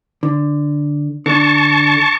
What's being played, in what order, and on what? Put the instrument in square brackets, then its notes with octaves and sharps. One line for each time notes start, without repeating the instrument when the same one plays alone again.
[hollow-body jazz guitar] D3
[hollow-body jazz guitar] D3 D4 [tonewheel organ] A5 C#6